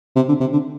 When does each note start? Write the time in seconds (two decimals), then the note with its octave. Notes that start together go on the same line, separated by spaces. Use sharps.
0.16 C3
0.28 D3
0.40 C3
0.52 D3